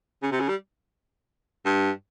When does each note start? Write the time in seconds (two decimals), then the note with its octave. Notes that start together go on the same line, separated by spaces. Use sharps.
0.23 C#3
0.32 C3
0.40 C#3
0.49 G3
1.66 G2